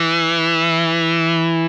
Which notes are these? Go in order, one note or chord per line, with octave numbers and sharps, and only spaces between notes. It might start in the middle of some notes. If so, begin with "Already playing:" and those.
Already playing: E3